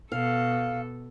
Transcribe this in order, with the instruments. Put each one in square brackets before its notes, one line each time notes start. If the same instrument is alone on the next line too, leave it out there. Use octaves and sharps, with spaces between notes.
[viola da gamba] B2 A4 [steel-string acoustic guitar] F5